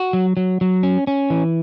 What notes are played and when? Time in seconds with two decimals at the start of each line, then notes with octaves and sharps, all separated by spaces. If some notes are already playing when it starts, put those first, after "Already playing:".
Already playing: F#4
0.13 F#3
0.37 F#3
0.61 F#3
0.83 C#4
1.07 C#4
1.30 E3